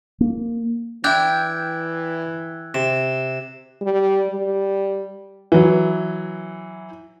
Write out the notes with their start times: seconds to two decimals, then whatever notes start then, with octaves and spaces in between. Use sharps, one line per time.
0.21 A#3
1.04 E3 D4 E4 G5 E6 F#6 G#6
2.74 C3 E7
3.81 G3
4.31 G3
5.52 E3 F#3